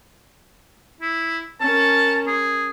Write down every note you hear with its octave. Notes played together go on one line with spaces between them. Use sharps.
E4
C#4 A#4 A5
G#4